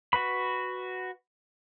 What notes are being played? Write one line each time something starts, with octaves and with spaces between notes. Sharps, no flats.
F#4 B4 B5